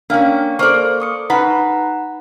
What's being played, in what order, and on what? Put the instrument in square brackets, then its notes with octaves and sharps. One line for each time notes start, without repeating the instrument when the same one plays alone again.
[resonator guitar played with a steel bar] A#3 C#4 [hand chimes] D4 F5 G5
[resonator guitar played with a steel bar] A#3 D5 [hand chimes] A4 C5 C#6
[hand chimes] C#6 D#6 C#7
[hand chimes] D#4 F#5 A#5 [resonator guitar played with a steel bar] B4